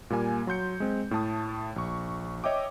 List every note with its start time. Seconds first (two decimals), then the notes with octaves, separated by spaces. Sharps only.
0.10 A#2 G3 A#3 G#5
0.47 F#3 C6 G6 C#7
0.80 G#3 C4
1.11 A2 A3 A5 D#6
1.76 A#1 C#6
2.44 C#5 D#5 E5 G5 D6